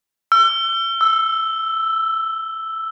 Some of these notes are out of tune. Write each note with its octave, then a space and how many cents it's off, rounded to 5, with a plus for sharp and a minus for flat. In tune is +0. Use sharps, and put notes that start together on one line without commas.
E6 +40
E6 +0